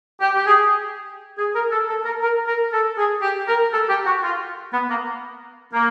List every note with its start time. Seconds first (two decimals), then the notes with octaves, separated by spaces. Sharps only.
0.21 G4
0.35 G4
0.46 G#4
1.38 G#4
1.55 A#4
1.72 A4
1.89 A4
2.05 A#4
2.22 A#4
2.47 A#4
2.72 A4
2.97 G#4
3.22 G4
3.48 A#4
3.73 A4
3.89 G4
4.06 F#4
4.23 F4
4.73 B3
4.90 A#3
5.73 A#3